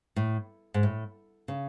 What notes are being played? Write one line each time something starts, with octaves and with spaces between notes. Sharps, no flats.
A2
G#2
A2
C#3